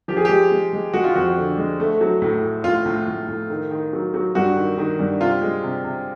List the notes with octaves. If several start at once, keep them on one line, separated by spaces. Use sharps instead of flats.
F3 G4
G#4
G#3 G4
G#3
G#3
G#3 F#4
F4
F2 F#4
D3
G#3
A3
F#3
A2
A2
A2 F4
A2
A2
A2
D#3
D#3
F#3
F#3
G2 F#4
D#3
D#3
G2
C3 F4
G#3
C3
C3